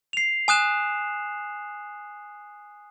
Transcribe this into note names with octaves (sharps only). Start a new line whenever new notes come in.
C7 F7
G#5 D#6 F#6 E7